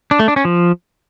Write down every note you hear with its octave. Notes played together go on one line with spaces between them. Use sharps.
D4
A3
D4
C#4
F3